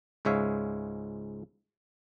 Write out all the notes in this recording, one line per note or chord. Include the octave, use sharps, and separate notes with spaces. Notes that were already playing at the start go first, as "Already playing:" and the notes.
C#2 G#2 G#3 C#5 E5 F5